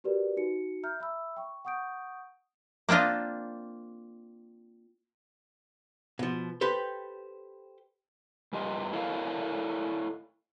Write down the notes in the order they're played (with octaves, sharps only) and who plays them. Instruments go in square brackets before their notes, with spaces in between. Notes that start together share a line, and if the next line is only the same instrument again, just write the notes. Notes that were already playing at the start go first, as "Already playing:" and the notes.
[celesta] F#4 G4 A#4 B4 D5
D#4 F#4 C#7
E5 A#5 F6 G6
E5 B5 E6
G5 C#6
F#5 C#6 D#6 G6 D7
[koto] A#3 C4 D4 F4 D#5
[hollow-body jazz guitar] B2 F3
G4 A4 B4 C5
[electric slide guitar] G2 G3 F4 D#5
E4 A4 A#4 C#5 D#5 F5